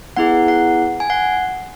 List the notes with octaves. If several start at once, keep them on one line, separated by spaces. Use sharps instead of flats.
B3 E4 G#4 F#5
F#5
G#5
F#5